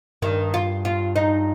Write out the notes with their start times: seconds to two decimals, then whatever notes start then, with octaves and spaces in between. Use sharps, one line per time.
0.22 G2 D#3
0.54 F4
0.85 F4
1.16 D#4